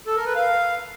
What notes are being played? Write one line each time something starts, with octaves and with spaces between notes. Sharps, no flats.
A4
A#4
B4
F5